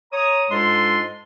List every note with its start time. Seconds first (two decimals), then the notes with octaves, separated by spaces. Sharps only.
0.13 C#5 A#5 D#6
0.51 G#2 G#3 D4 F4 A4 C6